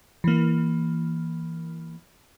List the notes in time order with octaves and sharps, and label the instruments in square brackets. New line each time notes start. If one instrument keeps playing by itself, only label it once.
[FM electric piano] E3 A#3